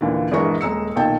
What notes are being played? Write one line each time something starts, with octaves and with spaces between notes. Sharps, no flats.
D#2 A#2 D3 E3
A#1 G2 E3 G#3 A#4 C#6
D#1 G#3 A#5 E6 C#7
B1 A#2 D#3 G5 A5